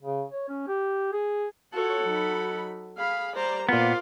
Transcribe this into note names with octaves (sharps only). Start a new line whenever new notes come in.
C#3
C#5
C#4
G4
G#4
F4 F#4 A4 C#5 F#5
F#3 D#4 B5
G#4 F5 B5
G3 C5 D5 A#5
A#2 B3 F4 A#4 C5 D5